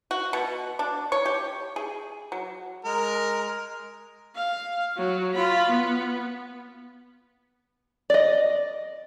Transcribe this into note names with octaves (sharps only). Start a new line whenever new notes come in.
F#4
B2
D4
C#5
G4
G#4
F#3
G#3 A#4
F5
F#3
F4 B5
B3
D5 D#5